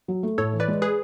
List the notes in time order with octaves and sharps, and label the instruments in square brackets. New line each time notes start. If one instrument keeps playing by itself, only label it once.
[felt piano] F#3
A3
[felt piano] A2 [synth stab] A4 C#5
[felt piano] E3
[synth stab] B4 D5
[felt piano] G#3
[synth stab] G#4 B4